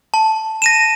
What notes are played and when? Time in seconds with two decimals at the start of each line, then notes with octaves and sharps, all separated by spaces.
0.14 A5
0.62 A#6 D#7 E7